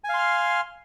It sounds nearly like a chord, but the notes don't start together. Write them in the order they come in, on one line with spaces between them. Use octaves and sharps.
G#5 F5 C6 F6